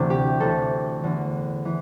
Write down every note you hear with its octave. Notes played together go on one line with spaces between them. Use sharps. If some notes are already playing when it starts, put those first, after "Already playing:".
Already playing: D2 C3 E3 D4
G4
D2 C3 E3 A4
E2 D3
E3